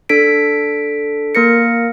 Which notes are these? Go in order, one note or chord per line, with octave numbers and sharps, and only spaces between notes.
D4 A4 B6 D7
A#3 A#4 A#6 C#7